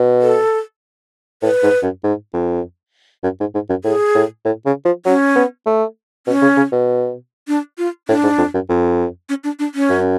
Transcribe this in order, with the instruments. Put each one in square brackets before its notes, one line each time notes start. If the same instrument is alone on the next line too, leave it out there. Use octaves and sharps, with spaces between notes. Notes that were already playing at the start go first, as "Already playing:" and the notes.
Already playing: [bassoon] B2
[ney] A4
[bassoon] A2 [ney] B4
[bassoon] G#2
F#2
G#2
F2
F#2
G#2
G#2
F#2
[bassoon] A2 [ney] G#4
[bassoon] A2
A2
C#3
F3
[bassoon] F#3 [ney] C#4
[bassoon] B3
A3
[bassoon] B2 [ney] C#4
[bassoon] C#3
C#3
B2
[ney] D4
F4
[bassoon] A2 [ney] D4
[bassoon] G#2
F2
F#2
F2
[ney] C#4
D4
D4
C#4
[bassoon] F#2